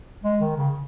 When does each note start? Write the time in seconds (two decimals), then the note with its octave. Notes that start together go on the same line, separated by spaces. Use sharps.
0.24 G#3
0.40 D#3
0.56 C#3